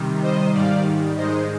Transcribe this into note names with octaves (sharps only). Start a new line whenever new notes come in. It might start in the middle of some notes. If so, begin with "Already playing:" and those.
Already playing: C3 D#3 G3
C5 D#5
G#2 D#3 G3 D5 F5
G#2 D#3 G#3 C5 D#5